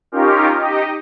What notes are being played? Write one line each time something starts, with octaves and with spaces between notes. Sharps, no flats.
C#4 D#4 F4 G4 A#4
D#4 G4 D#5